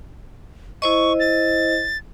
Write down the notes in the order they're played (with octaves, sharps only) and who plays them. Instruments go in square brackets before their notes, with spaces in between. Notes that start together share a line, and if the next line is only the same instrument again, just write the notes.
[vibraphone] E4 C5 D#5 [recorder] C#6
[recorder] A6